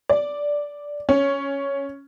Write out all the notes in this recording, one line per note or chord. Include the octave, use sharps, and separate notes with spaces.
D5
C#4